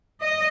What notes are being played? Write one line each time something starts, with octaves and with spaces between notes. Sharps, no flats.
D#5